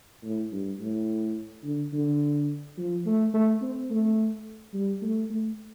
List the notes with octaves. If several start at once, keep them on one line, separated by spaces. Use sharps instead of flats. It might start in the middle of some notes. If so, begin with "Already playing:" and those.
A2
G2
A2
D3
D3
F3
A3
A3
C4
A3
G3
A3
A3